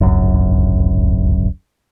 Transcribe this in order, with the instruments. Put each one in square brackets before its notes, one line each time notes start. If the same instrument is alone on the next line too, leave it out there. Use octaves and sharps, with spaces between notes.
[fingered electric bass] D1 G#1 C#2 F#2